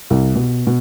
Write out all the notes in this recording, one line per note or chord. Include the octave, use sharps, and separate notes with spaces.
C2
B2
B2